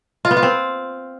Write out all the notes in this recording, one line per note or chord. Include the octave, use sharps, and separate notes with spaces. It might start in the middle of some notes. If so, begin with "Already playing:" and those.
F4
B3
F4
C4